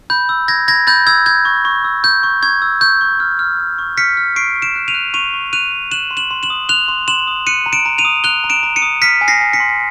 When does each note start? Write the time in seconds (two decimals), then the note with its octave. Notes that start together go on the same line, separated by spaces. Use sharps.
0.10 B5 G6
0.29 E6
0.48 G6 G#6 A#6
0.68 B5 G#6 A#6
0.87 B5 G6 A6
1.07 E6 G#6
1.26 G6 G#6
1.45 C#6
1.65 C#6
1.84 E6
2.04 G6
2.23 C#6
2.42 C#6 G#6
2.62 E6
2.81 C#6 G6
3.01 C#6
3.20 F6
3.39 F6
3.59 C#6
3.79 C#6
3.97 F6 B6 C#7
4.17 F6
4.36 C#6 C7 D7
4.55 C#6
4.62 D7 E7
4.75 F#6
4.88 D#7 F7
4.94 F#6
5.14 C#6 D#7 F7
5.33 C#6
5.53 F#6 D#7 F7
5.72 F#6
5.91 F#6 E7 F#7
6.11 C6
6.17 E7 F#7
6.31 C6
6.43 E7 F#7
6.50 D#6
6.69 F#6 F7 G7
6.88 C6
7.08 C6 E7 F#7
7.27 D#6
7.47 F#6 C#7 D#7
7.66 A#5
7.73 D7 E7
7.86 A#5
7.98 D#7 F7
8.05 D#6
8.24 F#6 F7 G7
8.44 A#5
8.50 D7 E7
8.63 A#5
8.76 C#7 D#7
8.82 D#6
9.02 F6 B6 C#7
9.21 G#5
9.28 A#6 C7
9.41 G#5
9.53 B6 C#7
9.60 C6